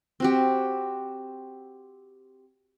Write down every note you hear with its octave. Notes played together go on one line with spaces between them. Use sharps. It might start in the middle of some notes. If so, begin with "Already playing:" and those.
C4 F#4 G4